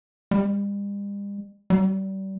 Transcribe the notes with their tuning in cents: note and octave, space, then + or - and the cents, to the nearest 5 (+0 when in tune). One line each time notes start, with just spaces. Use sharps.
G3 +45
G3 -30